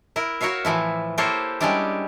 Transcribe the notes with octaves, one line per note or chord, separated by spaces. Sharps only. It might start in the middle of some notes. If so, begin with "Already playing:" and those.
E4 A#4
F#4 A#4 C#5 E5 F5
A2 E3 F3 E4
A#3 E4 G4 A4 C5 C#5
G3 G#3 C#4 D4 E4 G4